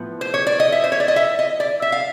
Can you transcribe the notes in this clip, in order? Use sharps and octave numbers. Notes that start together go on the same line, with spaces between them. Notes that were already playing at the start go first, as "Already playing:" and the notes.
Already playing: A2 F3 B3
C5
C#5
D5
D#5
E5
C5
C#5
D5
D#5
E5
D#5
D5
E5
F5